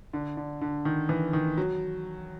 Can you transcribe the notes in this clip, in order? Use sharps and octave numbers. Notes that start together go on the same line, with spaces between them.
D3
D3
D3
D#3
E3
D#3
F#3